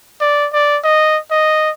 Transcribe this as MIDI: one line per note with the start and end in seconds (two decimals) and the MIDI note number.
0.21 0.48 74
0.53 0.78 74
0.84 1.18 75
1.31 1.70 75